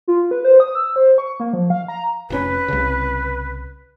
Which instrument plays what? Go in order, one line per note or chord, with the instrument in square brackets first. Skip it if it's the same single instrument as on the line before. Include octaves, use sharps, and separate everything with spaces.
[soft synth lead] F4
B4
C5
D#6
E6
C5
C#6
A#3
F3
F5
A#5
[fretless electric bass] F1 C3 C#4 [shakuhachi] B4
[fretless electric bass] C2 C#3